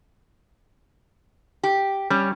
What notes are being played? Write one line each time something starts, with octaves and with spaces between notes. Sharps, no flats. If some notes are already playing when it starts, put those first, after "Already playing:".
G4
G3 C#4